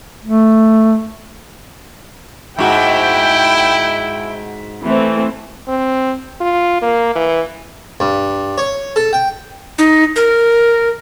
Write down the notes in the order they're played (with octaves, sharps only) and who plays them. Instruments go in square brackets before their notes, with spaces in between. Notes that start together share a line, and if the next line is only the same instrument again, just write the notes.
[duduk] A3
[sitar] G#2 F#4 [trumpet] E4 [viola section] G5
[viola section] E3 A3 C4
[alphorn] C4
F4
A#3
E3
[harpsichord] G2
C#5
A4
G5
[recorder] D#4
A#4